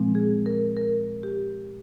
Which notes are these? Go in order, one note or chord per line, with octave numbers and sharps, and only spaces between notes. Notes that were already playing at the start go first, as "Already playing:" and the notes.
Already playing: A#2 F3 G#3 C4
G#4
A#4
A#4
G4